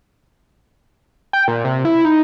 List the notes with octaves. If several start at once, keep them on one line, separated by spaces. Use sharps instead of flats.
G5
A#2
C3
E4
D#4